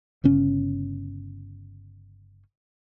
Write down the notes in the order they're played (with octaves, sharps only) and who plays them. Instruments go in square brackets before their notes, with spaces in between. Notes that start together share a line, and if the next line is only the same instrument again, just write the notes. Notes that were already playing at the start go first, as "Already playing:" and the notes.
[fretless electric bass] G1 C#3 C#4